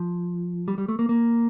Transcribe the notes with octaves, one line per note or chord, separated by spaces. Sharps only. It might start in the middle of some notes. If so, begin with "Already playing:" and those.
Already playing: F3
G3
G3
A3
A#3
A#3